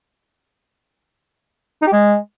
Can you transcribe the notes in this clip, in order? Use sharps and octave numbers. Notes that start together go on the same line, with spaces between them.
D#4
G4
G#3